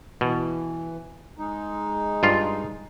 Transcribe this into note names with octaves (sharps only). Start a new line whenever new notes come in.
B2 E3
G#3 D#4
G2 F4 F5